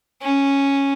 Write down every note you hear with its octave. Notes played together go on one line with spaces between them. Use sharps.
C#4